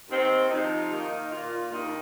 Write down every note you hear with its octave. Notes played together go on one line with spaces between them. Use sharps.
D#2 D#3 C4
C3 F3 D#4
D#3 A#3 D#4
A#2 A#3 F4
G2 D#3 A#3 D#4